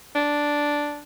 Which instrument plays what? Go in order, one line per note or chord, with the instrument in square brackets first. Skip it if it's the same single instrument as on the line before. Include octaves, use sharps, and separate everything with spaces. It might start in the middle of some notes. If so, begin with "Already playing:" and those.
[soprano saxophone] D4